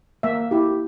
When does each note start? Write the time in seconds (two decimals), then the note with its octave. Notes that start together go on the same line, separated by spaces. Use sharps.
0.23 A#3 E5
0.51 E4 G4